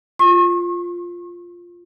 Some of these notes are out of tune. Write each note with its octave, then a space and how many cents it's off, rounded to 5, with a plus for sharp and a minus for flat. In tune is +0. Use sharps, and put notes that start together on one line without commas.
F4 +0 C#6 -40